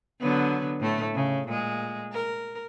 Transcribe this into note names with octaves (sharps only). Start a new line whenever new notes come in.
D3 F#3 B3
A2 A3
C#3
A#2 G#3
A#4